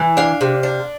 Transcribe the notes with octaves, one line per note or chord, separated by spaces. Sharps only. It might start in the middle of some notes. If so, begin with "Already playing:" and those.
Already playing: E3
D4 F5
C3
D4